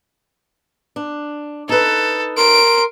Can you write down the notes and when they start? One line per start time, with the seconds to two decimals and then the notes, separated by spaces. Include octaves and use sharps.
0.96 D4
1.69 D#4 A4 B4
2.37 A#4 C6 D7